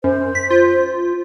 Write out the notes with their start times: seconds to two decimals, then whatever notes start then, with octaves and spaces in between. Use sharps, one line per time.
0.04 F#2 C5
0.35 B6
0.50 F4